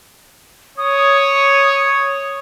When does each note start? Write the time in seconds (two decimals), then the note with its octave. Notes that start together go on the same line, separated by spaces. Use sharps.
0.78 C#5 D#6